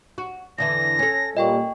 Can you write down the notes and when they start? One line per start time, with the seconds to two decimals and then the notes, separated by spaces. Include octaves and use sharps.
0.18 F#4
0.58 E2 D3 E3 A#6
0.99 C#4 A4
1.37 A#2 G3 D#5 G5 C#6